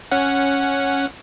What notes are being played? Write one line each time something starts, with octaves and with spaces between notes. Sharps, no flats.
C#4 F#5